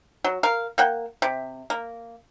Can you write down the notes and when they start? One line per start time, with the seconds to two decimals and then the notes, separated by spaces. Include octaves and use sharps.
0.24 F#3
0.43 A#4 F5
0.78 A#3 F#5 G5
1.22 C3
1.70 A#3